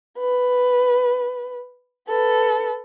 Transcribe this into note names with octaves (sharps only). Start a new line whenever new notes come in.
B4
A4 B4